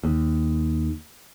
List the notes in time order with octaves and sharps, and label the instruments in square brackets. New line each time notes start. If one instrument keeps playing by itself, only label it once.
[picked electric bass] D#2